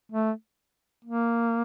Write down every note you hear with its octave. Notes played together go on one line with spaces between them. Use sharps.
A3
A#3